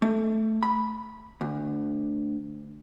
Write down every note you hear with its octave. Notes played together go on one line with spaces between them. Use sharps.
A3
B5
D2